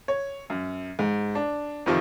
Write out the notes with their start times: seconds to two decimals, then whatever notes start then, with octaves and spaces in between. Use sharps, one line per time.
0.08 C#5
0.50 F#2
0.99 G#2
1.35 D4
1.86 F2 C3 D#3 F3